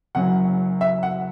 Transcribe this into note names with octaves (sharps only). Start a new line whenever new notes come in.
F#1 F#2 F#3 F#5
E5
F#5